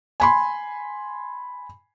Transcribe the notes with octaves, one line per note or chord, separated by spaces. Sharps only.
G#5 B5 C6